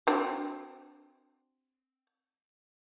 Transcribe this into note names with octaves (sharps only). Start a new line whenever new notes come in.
C4 D4 F#4